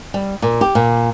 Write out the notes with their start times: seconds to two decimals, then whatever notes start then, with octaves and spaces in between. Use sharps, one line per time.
0.14 G3
0.42 A#2
0.61 G4
0.75 A#2